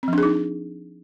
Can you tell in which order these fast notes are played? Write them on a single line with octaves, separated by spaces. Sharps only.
C4 F3 D4 G#4 D#4